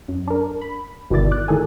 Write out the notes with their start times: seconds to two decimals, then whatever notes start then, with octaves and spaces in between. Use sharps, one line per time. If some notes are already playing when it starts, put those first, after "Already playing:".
0.08 F#2
0.28 D4 A#4
0.61 B5
1.10 G1 B2 D#3 E4 D5 A6
1.31 D6 F#6
1.48 A2 D#3 G#4 A4 G#5